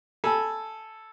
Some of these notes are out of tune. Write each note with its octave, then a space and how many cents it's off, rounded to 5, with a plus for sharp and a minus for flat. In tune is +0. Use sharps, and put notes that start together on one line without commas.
A4 +0 G#5 +0 B5 -25